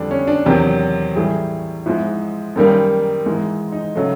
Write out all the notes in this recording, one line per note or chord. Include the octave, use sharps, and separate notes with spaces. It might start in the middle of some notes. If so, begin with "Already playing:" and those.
Already playing: F2 D3 G3 D4
C#4
D4
E2 C3 D#3 F#3 G4
A2 E3 G3 G#4
G#2 F3 G#3 E4
F#2 D#3 G3 A#3
G#2 E3 G#3
D#4
C#3 F#3 A3